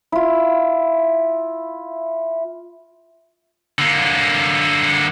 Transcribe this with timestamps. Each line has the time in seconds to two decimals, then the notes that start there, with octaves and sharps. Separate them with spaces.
0.12 E4 F4
3.79 D3 A#3